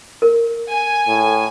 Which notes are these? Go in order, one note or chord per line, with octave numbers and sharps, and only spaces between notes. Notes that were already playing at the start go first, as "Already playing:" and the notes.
A#4
G#5
A2